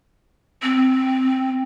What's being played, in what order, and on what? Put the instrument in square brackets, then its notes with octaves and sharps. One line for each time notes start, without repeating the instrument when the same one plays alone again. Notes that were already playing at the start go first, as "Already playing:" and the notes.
[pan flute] C4